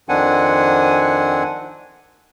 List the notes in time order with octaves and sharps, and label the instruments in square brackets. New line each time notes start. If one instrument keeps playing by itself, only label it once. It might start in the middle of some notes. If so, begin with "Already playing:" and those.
[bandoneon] F2 D#3 C4 D4 F#5 G#5